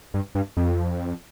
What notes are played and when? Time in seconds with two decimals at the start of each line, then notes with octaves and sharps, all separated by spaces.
0.14 G2
0.35 G2
0.57 F2